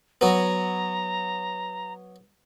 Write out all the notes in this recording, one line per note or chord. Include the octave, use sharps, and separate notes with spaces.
F#3 B3 A#5